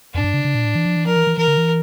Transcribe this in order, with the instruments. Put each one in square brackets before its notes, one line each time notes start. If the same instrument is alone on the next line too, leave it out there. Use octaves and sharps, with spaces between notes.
[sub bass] F2 [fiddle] D4
[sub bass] A2
G2
C#3
C#3
A#2
A2
E3
F3
E3
[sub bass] F3 [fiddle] A#4
[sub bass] E3
E3
[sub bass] E3 [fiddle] A#4
[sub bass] D3
E3